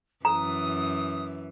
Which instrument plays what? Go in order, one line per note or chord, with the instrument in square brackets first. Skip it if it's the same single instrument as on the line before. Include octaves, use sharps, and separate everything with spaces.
[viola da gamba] F#2 E3 [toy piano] A#5 [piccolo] D#6